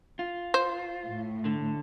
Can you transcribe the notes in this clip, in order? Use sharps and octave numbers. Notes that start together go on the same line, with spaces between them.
F4
C5
A2
D3